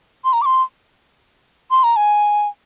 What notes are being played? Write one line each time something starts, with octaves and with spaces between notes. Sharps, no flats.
C6
A#5
D6
C6
C6
A#5
G#5